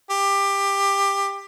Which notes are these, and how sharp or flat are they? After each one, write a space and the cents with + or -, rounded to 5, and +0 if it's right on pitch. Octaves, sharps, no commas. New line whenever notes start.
G4 +20